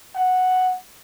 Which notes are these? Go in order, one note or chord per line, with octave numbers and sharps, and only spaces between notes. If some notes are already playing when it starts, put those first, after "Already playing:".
F#5